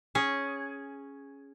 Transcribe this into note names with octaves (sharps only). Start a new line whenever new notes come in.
C#4 G#4